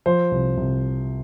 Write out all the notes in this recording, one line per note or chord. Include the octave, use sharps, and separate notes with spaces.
F3 C5
C2
C2